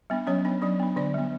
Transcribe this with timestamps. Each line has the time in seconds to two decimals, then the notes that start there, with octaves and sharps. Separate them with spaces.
0.10 G3 B3 D4
0.27 F#3 C#4 C#5
0.45 B3 D4
0.62 F#3 D4 D5
0.79 B3 D4
0.96 D3 D4 D5
1.14 G3 B3